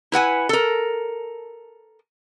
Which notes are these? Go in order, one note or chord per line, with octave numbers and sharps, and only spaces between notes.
E4 B4 F#5 G#5
A4 A#4